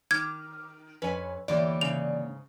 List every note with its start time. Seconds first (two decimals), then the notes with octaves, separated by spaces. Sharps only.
0.11 D#3 D6 F6 G#6
1.02 F2 C#4 B4 C#5 G#5
1.48 E2 D3 E3 A#3 G4 C#5 D5
1.81 G#2 C#3 F7